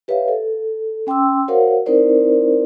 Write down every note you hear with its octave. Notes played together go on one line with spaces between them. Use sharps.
G4 B4 C#5 E5 F5
A4
C#4 G5 C6 D6 E6
F#4 A#4 C5 C#5 F5 F#5
C4 D#4 E4 A#4 C5 D5